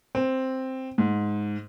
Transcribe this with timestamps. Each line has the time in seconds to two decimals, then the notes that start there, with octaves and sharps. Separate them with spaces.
0.15 C4
0.98 G#2